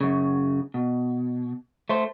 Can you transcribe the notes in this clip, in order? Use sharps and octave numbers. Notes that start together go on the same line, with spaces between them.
F#2 C#3
B2
A3 C5